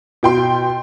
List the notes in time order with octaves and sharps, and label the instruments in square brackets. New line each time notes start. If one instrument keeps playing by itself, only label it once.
[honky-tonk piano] B2 G5 C6